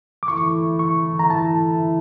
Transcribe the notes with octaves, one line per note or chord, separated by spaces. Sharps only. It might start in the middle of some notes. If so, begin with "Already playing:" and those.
D6
E3 A3 E4 C#6
C#6
A#5
A5